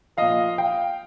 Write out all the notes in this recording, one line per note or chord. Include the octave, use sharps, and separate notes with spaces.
A#2 F3 D#5 F5
F5 G5